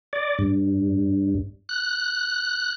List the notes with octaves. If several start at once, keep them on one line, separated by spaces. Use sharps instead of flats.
D5
G2
F#6